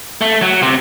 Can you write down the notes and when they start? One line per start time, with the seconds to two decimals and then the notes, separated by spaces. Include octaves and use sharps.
0.21 A3
0.42 F#3
0.62 C3